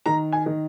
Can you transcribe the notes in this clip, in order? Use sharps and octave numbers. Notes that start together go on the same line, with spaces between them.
D#3 A#5
G#5
D#3